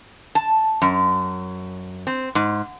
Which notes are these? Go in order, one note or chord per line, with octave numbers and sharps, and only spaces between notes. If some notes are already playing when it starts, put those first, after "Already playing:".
A5
F#2
C4
G#2